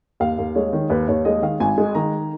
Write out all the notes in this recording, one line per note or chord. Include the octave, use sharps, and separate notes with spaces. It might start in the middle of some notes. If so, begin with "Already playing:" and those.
D#2 F5
D#2
G#3 C#5
D#3
D#2 B4
D#2 C#5
G#3 D#5
D#3 F5
G#1 G#5
G#3
D#3 A#5